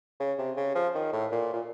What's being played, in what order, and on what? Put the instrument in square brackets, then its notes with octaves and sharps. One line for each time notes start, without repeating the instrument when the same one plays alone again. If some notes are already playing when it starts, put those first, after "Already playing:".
[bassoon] C#3
C3
C#3
F3
D#3
A2
A#2
A#2